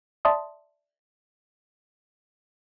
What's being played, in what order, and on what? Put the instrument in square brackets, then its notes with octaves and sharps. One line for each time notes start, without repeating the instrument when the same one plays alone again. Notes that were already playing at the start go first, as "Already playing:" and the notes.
[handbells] D5 E5 A5 C6 D#6